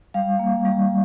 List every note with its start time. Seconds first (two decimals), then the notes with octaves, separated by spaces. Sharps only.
0.14 G3 F5
0.39 A#3
0.65 G3